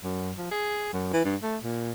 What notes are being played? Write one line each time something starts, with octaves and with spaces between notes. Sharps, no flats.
F#2
F3
G#4
F#2
E3
G2
A3
A#2